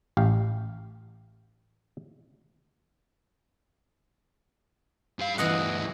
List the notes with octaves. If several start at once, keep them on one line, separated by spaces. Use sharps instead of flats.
A1 G4 F5
G2 F5
D2 G2 E3 D#5 F#5